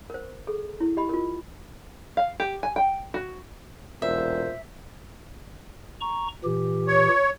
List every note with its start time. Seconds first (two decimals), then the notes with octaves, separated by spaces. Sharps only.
0.10 A#4 C5
0.47 G#4 A4
0.80 E4
0.97 G4 D#5 B5
1.09 F4 A#4
2.17 F5
2.40 G4
2.63 G#5
2.76 G5
3.14 F#4
4.02 E1 A#2 C5 E5
6.00 A#5 C#6
6.44 A#2 E3 G4
6.87 C#5